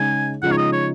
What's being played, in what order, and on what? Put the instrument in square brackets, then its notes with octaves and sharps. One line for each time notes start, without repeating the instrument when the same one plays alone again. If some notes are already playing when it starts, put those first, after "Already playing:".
Already playing: [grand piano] C#3 G#3 D#4 G#4 [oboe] G#5
[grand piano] C#3 F3 G#3 D#4 [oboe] F#5
[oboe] C#5
D#5
C#5